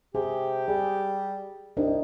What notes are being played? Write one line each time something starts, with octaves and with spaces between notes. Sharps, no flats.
C3 G4 G#4
G3 G#4
C2 D4 D#4